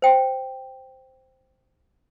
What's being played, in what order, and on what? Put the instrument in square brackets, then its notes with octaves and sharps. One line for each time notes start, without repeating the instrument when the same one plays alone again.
[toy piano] C5 G5